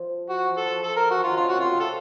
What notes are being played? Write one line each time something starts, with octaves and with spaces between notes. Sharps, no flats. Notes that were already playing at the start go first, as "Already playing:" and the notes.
Already playing: F3
F#4
F3
A4
F3
A4
A#4
F#4
F3
D#3 F4
C#3 F4
F#4
C3 F4
C3
A4